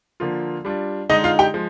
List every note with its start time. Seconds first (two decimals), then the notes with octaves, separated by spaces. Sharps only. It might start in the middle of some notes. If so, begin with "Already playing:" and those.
0.20 D3 F3 A#3 F4
0.65 G3 D4 F4
1.09 D3 G#3 D#4 D#5
1.24 F4 F5
1.39 G4 G5
1.54 F3 G#3